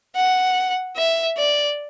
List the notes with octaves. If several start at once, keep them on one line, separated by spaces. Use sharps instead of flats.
F#5
E5
D5